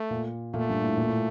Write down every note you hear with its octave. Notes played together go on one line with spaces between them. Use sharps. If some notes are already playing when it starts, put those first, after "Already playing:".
Already playing: A3
A#2
A#2 A3
G2
A2
A#2
A2